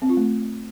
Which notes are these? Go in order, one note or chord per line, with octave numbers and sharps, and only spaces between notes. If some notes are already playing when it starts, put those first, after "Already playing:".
C4
F4
A3